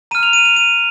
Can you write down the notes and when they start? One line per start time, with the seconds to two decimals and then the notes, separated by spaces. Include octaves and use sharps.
0.11 A#5 F6 D#7
0.23 F7
0.33 D#7
0.45 F7
0.56 D#7